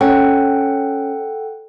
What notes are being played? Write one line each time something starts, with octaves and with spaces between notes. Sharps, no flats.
C#4 A4 F#5 G5